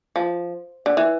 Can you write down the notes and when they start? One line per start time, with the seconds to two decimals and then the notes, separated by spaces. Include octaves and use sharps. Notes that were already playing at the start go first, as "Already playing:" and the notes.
0.16 F3
0.86 D3
0.97 E3